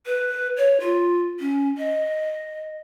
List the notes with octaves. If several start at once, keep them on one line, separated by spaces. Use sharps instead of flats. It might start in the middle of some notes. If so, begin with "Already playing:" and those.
B4
C#5
F4
C#4
D#5